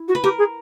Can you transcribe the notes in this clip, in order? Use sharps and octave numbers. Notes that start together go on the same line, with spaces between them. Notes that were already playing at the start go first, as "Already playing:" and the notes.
Already playing: E4
F#4
B4
G4 A#4
G#4